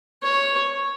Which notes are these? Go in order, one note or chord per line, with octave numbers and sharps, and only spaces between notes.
C#5